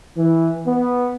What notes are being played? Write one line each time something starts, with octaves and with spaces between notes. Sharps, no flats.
E3
B3